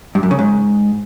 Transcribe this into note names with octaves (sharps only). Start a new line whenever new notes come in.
G2
F#2
C#3
G#2